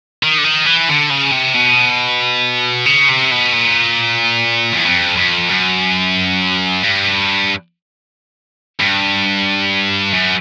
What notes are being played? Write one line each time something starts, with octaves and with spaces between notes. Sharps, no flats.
D#3
D3
D#3
E3
D3
C#3
C3
B2
C#3
C3
B2
A#2
E2
F2
F2
F#2
G2
G2
F#2